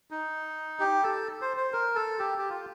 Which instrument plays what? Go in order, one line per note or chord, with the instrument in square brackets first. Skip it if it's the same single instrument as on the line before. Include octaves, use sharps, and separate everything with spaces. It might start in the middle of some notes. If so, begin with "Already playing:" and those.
[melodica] D#4
G4
A4
C5
C5
A#4
A4
G4
G4
F4